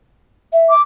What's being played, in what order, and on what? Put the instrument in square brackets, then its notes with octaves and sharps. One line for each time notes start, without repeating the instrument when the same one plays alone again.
[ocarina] E5
[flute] D6